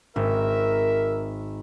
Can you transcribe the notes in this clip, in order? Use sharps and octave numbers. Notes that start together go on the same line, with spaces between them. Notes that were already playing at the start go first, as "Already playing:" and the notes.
G#1 A#4 E5